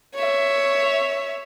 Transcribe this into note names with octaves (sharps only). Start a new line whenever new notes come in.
C#5 E5